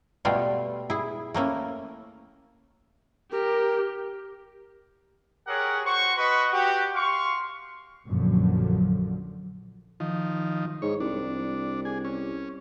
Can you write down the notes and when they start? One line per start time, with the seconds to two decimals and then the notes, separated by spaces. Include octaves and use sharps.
0.25 B2 G3 A3 F4
0.90 E4 G#4
1.34 A3 A#3 C#4 E4
3.32 G4 A#4
5.47 G4 G#4 A#4 C#5 F#5
5.85 F#4 C5 C#6
6.17 F#4 B4 D#5 C#6
6.52 F#4 G4
6.95 F5 C6 C#6
8.07 A#1 F#2 A#2 D3 F3 F#3
10.00 D#3 F3
10.82 G#2 C#5
11.00 C2 D4
11.85 G#4
12.05 C#4